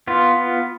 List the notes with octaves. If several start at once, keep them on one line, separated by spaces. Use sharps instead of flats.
B3 F4